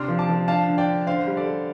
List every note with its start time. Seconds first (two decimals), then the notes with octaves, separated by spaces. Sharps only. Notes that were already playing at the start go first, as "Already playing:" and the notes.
Already playing: C3 D4 C6 F6
0.08 F3
0.19 A5 D6
0.29 F3
0.48 D4 F5 A5
0.67 D3
0.78 D5 G5
0.87 D3
1.07 D3 C5 F5
1.27 G3
1.37 A4 D5
1.47 G3